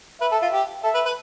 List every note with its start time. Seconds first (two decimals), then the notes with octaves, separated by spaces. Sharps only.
0.21 B4 E5
0.32 A4
0.42 F4
0.53 G4
0.84 A4 E5
0.94 B4
1.05 B4